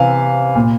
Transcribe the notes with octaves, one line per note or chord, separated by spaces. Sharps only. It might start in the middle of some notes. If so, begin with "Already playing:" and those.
Already playing: C3 E3 F5
A#2